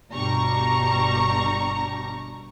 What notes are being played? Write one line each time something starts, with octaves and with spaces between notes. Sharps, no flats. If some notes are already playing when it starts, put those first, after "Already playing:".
G1 B2 G3 D4 A#5 C#6